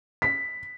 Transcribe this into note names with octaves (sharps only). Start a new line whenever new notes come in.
B6